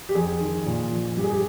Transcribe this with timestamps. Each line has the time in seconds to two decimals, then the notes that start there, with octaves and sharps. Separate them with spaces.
0.09 G4
0.15 F2 G#4
0.41 D#3
0.66 A#2
0.91 F3
1.17 G2 G4
1.24 G#4
1.31 G4